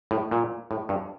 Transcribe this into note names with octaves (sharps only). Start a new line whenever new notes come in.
A2
A#2
A2
G2